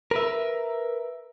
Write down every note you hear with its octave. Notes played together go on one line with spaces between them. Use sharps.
A#4 B4 E5